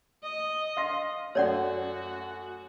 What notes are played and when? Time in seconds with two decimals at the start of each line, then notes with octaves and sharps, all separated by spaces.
0.23 D#5
0.77 F5 C6 A#6
1.35 F#2 A3 F#4 C#5 D5 F#5